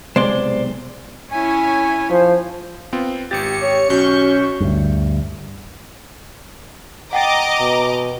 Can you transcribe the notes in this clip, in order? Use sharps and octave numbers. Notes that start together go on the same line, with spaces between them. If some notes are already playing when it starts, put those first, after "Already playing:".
B1 C3 G#3 C5 D5 C6
C#4 E4 C#5 G#5
F3 C5
B3 C4 F4
G#1 G4 A6 C#7
C#5
B1 C#4 F#4 C#6 G6
D2 G2
D#5 F#5 G5 A#5 D6 A6
B2